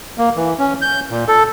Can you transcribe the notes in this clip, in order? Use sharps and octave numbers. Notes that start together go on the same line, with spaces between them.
A#3
E3
C#4
G6
A#2
A4